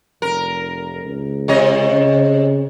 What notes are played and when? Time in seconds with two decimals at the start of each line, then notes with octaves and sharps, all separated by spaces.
0.22 F1 A#4
1.03 C#2
1.48 C3 C#5 D#5
1.91 C#3